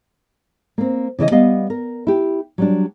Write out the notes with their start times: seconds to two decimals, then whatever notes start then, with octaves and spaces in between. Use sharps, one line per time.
0.78 A#3 C4
1.19 C#3 E3 D5 D#5
1.31 G3 B3 D#5 F5
1.70 A#4
2.07 E4 G4
2.58 F#3 G3 D4